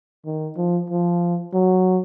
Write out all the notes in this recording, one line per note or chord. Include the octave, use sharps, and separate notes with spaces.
D#3
F3
F3
F#3